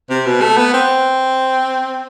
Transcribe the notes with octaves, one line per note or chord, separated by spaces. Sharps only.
C3
B2
A3
B3
C4